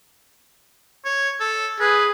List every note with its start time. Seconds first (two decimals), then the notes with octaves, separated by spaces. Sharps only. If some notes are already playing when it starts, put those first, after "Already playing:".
1.05 C#5
1.40 A4
1.80 G#4 B4